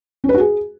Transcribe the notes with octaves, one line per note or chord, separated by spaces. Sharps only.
C#4
B4
F#4
G#4